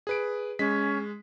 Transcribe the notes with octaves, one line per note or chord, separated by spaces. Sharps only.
G#4 B4 D7
G#3 C#4 B6